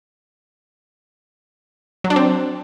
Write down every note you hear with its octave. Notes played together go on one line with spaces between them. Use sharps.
F#3
D4
C4